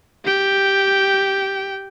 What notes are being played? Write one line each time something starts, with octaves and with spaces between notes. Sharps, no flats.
G4 G5